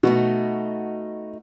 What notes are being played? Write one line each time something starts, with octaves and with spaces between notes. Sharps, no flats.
B2 A3 D#4 F#4